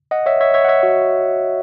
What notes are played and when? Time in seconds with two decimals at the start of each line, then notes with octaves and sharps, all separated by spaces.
0.11 D#5 F#5
0.26 C#5 E5
0.40 C#5 E5
0.54 C#5 E5
0.64 F#5
0.68 C#5 E5
0.83 F#4